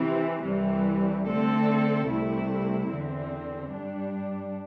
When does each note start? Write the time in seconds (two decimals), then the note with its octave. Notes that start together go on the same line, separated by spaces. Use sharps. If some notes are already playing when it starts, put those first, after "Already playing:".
Already playing: C3 E3 C4
0.44 C2 C3 E3 G3
1.26 D3 A3 C4 A4
2.08 C2 C3 A3 E4
2.91 E2 D3 C4
3.72 G2 G3 D4